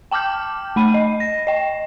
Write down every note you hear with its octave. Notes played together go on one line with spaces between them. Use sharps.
G5 A5 D6 F6 G6
A3 B5 D#7
D#5
A#6
D#5 G5